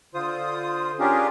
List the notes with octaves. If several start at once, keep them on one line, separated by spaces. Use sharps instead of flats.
D3 F4 C5 D#6
C#4 D4 F4 G4 G#4 A#4